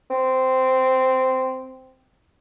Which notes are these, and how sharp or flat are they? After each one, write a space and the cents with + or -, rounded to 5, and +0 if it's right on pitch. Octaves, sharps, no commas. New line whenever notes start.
C4 -10